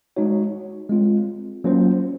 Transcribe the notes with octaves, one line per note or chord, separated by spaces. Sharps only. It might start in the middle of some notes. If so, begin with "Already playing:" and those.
G#3 D#4 F#4 C#5
G#3 C4 F4
F#3 A#3 C#4 F4 C5